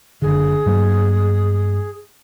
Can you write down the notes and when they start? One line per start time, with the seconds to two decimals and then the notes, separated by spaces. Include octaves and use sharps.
0.22 F#1 D3 G#4
0.66 G2 F#3 A#3